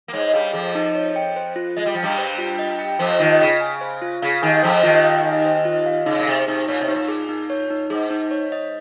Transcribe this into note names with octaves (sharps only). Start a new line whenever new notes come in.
A#3
G#2 G#3 C#5
G2 G3 F5
F2 F3 G#4
D#4
C#5
G5
C5
F4
G#3 D#5
G3
F3 G5
G2 G3
C5
F4
D#5
G5
F2 F3 C5
D#2 D#3 F4
C#3 D#5
G#5
C5
F4
C#3 F5
D#2 D#3 G#5
F2 F3 C5
D#2 D#3 F4
F5
G#5
C5
F4
F5
C#3 D#4
A#2
C3 G#4
C3 D#4
A#2 C#5
C3
D#4
A#2
G#4
D#4
C#5
D#4
G#2 G#4
D#4
C#5
D#5